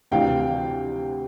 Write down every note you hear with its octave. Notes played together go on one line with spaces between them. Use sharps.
D2 C3 E3 F5 G5